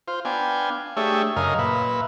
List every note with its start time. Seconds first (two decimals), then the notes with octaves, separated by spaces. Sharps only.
0.08 F4 C5
0.25 B3 D4 F5 G5 G#5
0.97 A3 D4 G4 G#4 C#5 E5
1.36 F#2 C#3 A#4 D#5 F5
1.59 A#2 B4 E5